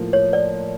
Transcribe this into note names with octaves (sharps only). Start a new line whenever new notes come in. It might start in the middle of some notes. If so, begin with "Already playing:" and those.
Already playing: A2 F3 A#3
C#5
D5